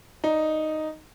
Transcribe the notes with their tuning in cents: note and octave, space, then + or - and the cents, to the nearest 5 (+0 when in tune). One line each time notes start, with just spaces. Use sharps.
D#4 +0 D5 +0